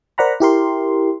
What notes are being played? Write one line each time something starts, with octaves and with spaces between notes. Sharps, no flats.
A#4 C5 D5 F#5 A#5 B5
E4 G4 A#4 C6